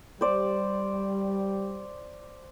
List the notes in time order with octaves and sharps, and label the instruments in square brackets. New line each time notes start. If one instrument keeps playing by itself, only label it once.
[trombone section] G3 [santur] C5 D5